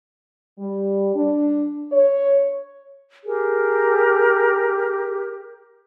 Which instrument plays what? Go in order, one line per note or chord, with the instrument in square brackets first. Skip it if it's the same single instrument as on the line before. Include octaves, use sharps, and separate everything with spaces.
[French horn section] G3
D4
C#5
[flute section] G4 G#4 A#4